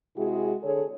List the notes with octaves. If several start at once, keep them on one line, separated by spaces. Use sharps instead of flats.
C3 G#3 E4 F#4 G#4
D3 G#4 A4 C#5